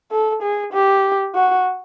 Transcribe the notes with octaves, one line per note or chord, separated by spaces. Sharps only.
A4
G#4
G4
F#4